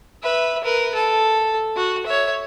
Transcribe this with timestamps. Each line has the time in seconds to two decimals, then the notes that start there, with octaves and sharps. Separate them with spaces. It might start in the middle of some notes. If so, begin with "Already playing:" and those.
0.23 B4 E5
0.64 A#4 B4
0.95 A4
1.76 F#4
2.06 C#5 E5